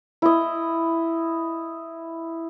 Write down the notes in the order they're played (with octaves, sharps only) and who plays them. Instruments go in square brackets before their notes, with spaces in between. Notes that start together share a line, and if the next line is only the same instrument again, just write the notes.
[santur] E4 D#5